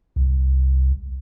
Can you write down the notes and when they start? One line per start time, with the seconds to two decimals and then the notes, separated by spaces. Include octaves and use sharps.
0.16 C2